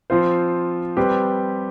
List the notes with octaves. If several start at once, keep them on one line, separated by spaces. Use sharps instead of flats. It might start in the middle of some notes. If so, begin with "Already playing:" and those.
F3 C4 F4 C5
G3 C4 G4 B4